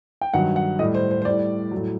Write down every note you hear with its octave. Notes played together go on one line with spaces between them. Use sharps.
G5
G2 D#3 F#3 F#5
F#5
A2 G3 D#5
C5
C5
C5
A2 G3 D5
F#3
A2